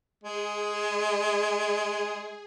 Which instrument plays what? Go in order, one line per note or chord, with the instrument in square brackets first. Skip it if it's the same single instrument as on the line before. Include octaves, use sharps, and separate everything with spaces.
[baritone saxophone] G#3 [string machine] G#4